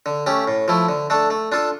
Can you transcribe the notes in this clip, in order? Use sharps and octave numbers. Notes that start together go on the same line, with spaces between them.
D3
A3 C#4 G4
A2
F3 A3 E4
D3
A3 D4 A4
A3
D4 F4 A4